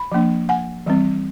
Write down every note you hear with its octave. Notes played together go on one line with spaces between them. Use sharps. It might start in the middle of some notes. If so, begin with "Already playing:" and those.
Already playing: B5
F3 A#3 D4
F#5 G#5
E3 G3 C4